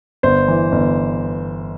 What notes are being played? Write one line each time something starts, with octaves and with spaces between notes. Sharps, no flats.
G1 C5
E3
G1